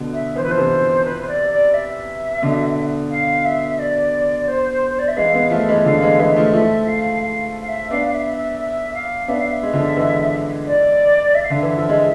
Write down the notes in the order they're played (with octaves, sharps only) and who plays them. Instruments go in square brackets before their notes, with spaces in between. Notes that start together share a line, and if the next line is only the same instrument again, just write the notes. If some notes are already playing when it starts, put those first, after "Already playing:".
Already playing: [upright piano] B2 D3
[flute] E5
[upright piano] E3 [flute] C5
[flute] B4
[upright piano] F3 [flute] C5
[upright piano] C3 E3
[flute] B4
C5
D5
D5
E5
[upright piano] B2 D3
[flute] F5
E5
D5
C5
C5
D5
E5
[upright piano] E3 G#3 [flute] F5
[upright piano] G#3 B3
[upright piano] F3 A3 [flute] E5
[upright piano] E3 G#3
[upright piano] D3 F3 [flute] F5
[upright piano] E3 G#3
[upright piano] E3 G#3 [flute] E5
[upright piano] F3 A3
[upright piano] F3 A3 [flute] E5
[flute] F5
F5
F5
E5
[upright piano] B3 D4 [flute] F5
[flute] F5
E5
E5
E5
F5
[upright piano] B3 D4 [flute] E5
[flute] F5
E5
[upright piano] G#3
D3 F3
E3 G#3
[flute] D5
E5
F5
[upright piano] D3 [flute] E5
[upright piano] E3
[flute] E5
[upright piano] F3
G#3